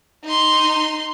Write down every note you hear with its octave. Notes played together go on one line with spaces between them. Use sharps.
D#4 C6